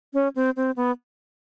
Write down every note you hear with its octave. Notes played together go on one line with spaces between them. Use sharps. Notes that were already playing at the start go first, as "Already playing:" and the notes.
C#4
C4
C4
B3